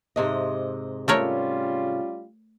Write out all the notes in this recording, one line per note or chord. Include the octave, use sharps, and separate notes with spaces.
G#2 C3 D#5
G3 A3 C#4 F4 A#4 C#5